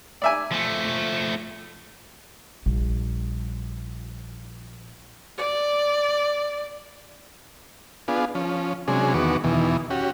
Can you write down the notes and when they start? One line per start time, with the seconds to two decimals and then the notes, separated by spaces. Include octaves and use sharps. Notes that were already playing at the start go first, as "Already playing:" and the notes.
0.22 D5 E5 G#5
0.51 F3 A3
2.66 A#1 G3
5.37 D5
8.08 B3 D4 F4 G#4
8.35 F3 C#4
8.88 C3 F#3 G#3 C#4 D4 G#4
9.14 E2 D#3 B3 F#4 C#6 D6
9.44 E2 B2 D#3 E3
9.90 C#4 F#4 G4